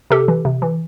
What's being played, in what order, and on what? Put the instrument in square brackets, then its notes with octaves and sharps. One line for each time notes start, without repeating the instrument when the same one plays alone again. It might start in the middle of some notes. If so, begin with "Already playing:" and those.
[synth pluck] C3 G4 A4
E3
C3
E3